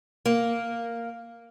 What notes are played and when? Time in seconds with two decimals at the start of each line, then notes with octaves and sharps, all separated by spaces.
0.26 A#3